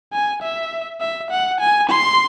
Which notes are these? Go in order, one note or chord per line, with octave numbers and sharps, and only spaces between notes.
G#5
E5
E5
F#5
G#5
C6